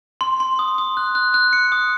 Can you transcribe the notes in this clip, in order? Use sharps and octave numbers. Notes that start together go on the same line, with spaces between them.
C6
C6
D#6
D#6
F#6
F#6
F#6
C#7
D#6